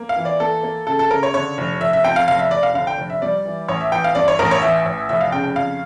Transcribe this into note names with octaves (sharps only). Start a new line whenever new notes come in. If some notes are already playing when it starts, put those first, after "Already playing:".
Already playing: A#3
F5
E3
D5
A#3 A4
A#3
C#3 A4
A4
C#3 A#4
C#5
D3 C#5
F1
F1 E5
E5
F2 G5
F5
F1 F5
E5
F1 D5
F5
D3 F5
G5
F1
E5
G3 D5
E3
A1 C#5
E5
E3 G5
F5
G2 D5
C#5
A1 A#4
C#5
E3 E5
A1
F1 E5
F5
C#3 G5
G5
F2 F5